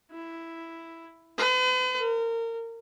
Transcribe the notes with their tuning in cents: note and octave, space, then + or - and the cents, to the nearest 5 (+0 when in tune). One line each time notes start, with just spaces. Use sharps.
E4 +5
B4 +45
A#4 -25